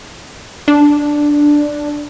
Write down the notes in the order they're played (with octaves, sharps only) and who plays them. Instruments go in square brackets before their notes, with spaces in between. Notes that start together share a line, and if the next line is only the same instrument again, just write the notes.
[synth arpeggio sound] D4